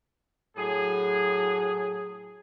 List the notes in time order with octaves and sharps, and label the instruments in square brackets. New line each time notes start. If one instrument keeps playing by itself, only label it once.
[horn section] A2 F#3 G#4